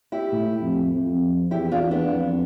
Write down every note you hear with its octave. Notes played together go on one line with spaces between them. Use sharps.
E4 G4
A2
F2
F2
E2 E4 G4
D4 F4
E2
B3 D4
F2